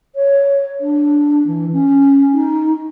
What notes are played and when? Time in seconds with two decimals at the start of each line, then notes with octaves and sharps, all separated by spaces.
0.15 C#5
0.80 D4
1.46 E3
1.72 C#4
2.32 D#4